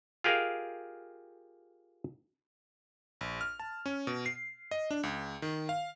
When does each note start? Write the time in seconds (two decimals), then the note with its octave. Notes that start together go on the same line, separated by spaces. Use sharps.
0.24 F4 G4 G#4 A#4 D#5 F5
3.21 A#1
3.41 F6
3.60 A5
3.86 C#4
4.07 B2
4.26 C7
4.71 D#5
4.91 D4
5.03 C#2
5.42 D#3
5.69 F5